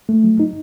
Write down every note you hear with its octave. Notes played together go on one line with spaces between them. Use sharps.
A3
F#3
D#4